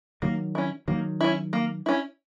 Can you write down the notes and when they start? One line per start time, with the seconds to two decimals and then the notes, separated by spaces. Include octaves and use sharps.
0.22 D#3 F#3 A#3
0.55 C#4 E4
0.88 D#3 F#3 A#3
1.21 C#4 E4
1.53 A#3
1.86 C#4 E4